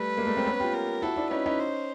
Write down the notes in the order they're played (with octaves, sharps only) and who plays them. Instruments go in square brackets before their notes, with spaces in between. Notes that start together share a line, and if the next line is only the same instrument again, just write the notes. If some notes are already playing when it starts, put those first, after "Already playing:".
Already playing: [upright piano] G3 A3 [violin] B4
[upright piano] G#3 A#3
G3 A3
A#3 C4
B3 C#4
F4 G4
[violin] A#4
[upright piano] E4 F#4 [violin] A4
[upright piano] D4 E4
[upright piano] C#4 D#4 [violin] B4
[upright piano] C#4 D#4
[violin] C5